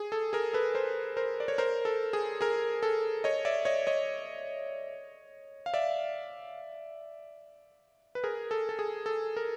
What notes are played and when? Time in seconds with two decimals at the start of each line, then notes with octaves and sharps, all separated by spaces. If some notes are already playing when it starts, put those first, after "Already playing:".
Already playing: G#4
0.12 A4
0.33 G#4 A#4
0.53 A4 B4
0.74 A#4 C5
1.17 A#4 C5
1.40 D5
1.48 C#5
1.58 A#4 C5
1.85 A4
2.13 G#4
2.41 G#4 A#4
2.83 A4
3.24 C#5 D#5
3.45 D5 E5
3.65 C#5 D#5
3.87 C#5 D#5
5.66 F5
5.73 D5 E5
8.15 B4
8.24 G#4 A#4
8.51 A4
8.69 A4
8.79 G#4
9.06 A4
9.37 A#4